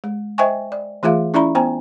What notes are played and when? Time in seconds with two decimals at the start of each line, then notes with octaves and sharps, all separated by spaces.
0.04 G#3
0.38 C5 D#5 E5 G5 G#5 C#6
0.72 D5
1.03 E3 A3 F4 G#4 E5 F5
1.34 C#4 E4 D5 E5 A#5 B5
1.55 B3 C5 G5 G#5 A#5